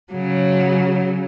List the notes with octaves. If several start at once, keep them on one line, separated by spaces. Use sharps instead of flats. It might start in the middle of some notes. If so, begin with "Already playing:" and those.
C#3 F#3